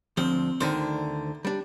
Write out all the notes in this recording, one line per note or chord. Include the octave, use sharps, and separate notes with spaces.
D2 F3 C4
D2 D3 D#3 C5
G3 D4